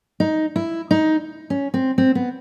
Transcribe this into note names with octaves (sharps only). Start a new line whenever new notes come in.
D#4
E4
D#4
C#4
C4
C4
B3